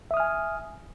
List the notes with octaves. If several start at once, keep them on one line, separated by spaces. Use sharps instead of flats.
E5 G#5 D#6 F6